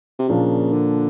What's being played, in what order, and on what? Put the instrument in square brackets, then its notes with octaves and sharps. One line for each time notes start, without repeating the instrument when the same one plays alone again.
[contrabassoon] C3
[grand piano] A#2 F3 A#3 D4 F4 [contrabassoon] C#3
[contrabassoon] D3